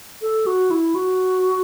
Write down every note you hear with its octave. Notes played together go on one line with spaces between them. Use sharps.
A4
F#4
E4
F#4